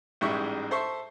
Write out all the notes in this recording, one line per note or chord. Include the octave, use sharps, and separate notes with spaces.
A1 G#2 G3 G#3 E5 C#6
A4 C5 E5 C6 C#6